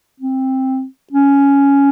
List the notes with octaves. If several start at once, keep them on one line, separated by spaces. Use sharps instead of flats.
C4
C#4